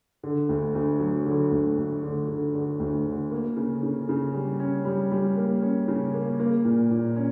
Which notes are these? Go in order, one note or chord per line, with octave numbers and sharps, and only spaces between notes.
D3
D2
D2
F#3
D3
D2
D2
D3
D3
D3
D2
D3
A#3
C#3
C#3
C#3
G3
C#4
G3
G3
A#3
C#4
C#3
A#3
A#3
A#2
A#2
C#4